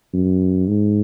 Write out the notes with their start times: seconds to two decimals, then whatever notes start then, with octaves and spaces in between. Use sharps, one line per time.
0.13 F#2
0.68 G#2